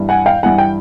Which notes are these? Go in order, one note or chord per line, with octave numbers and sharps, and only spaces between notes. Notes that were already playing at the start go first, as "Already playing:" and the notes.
Already playing: G2 E3
F#5 G#5
F5 G5
G2 E3 F#5 G#5
G5